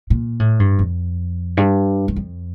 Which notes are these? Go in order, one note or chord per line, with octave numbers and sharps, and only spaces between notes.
A#2
A2
G2
F2
G2
G2
F2